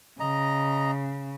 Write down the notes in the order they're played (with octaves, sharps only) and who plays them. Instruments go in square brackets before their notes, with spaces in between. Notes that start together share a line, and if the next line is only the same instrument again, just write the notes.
[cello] C#3 [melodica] D#5 A#5